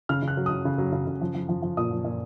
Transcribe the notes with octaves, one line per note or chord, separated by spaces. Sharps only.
C#3 F6
C#3
F#6
F#3
C#3 D#6
C#3
F#3
C#3
C#3
F3
F3
F3
F3
A#2 D#6
F3
A#2